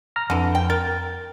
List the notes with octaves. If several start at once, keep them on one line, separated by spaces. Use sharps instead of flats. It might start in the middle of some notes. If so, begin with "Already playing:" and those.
A#5 F6 A#6
F2 D3 E3
G5
A#4 A6